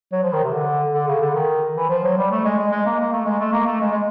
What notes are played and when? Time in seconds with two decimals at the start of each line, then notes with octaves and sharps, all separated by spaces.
0.12 F#3
0.23 F3
0.33 D#3
0.44 C3
0.53 D3
0.94 D3
1.07 C#3
1.21 D3
1.35 D#3
1.77 E3
1.89 F3
2.04 F#3
2.17 G3
2.31 A3
2.45 G#3
2.58 G#3
2.71 G#3
2.86 A#3
3.00 A#3
3.13 A3
3.26 G#3
3.40 A3
3.53 A#3
3.67 A3
3.81 G#3
3.91 G#3